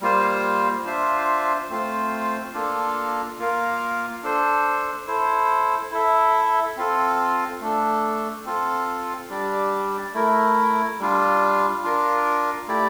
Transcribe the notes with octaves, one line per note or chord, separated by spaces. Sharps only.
G3 A#3 F4 C5
D4 F4 C5 E5
A3 C4 F4 C5
A#3 D4 F4 A4
A#3 F4 A#4 F5
D4 A4 C5
E4 A4 C5
E4 A4 E5
C4 F4 A4
A3 D4 A4
C4 F4 A4
G3 D4 G4 D5
A3 E4 A#4
G3 D4 F4
D4 F4 A#4
A3 E4 G4 D5